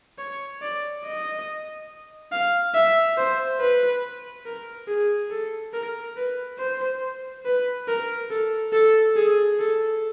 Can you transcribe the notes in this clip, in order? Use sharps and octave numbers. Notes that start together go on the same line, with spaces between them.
C#5
D5
D#5
F5
E5
C5
B4
A#4
G#4
A4
A#4
B4
C5
B4
A#4
A4
A4
G#4
A4